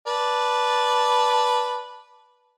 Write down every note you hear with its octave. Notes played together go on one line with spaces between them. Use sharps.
B4 D5 A5